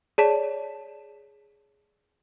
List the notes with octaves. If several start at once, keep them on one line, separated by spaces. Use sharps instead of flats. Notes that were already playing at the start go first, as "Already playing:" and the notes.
G#4 C#5 D5 A5 B6 E7